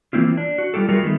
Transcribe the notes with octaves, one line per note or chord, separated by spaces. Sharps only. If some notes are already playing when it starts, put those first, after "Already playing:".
E3 A#3 C4 E4 F4
D4
F#4
G3 F4 G4 A4
G3 A3 F4 F#4 G#4 A#4
D#3 G#3 A3 B3